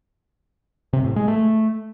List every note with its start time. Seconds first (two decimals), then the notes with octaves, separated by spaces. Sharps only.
0.93 C3
1.05 A2
1.16 G#3
1.28 A3